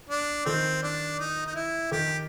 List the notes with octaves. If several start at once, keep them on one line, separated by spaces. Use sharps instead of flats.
D4
D#3 C4
D4
D#4
D#4
E4
D#3 G4